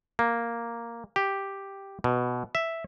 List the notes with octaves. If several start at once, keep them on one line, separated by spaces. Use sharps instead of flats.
A#3
G4
B2
E5